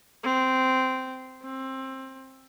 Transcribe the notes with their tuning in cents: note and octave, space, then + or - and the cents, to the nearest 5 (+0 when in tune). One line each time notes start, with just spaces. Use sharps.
C4 -10
C4 +20